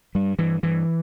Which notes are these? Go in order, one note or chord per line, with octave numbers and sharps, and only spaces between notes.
G2 G3
G2 E3
G2 E3